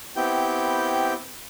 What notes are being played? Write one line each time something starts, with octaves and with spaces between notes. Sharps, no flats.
B3 C4 E4 G4 G5 G6